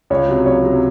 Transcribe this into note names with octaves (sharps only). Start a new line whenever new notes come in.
C#2 C#5
C3 F#3
C#2 C#5
C3 F#3